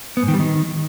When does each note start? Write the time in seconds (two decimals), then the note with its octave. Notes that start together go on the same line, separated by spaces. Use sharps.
0.17 B3
0.23 G#2
0.28 D#3
0.34 G3
0.40 D#3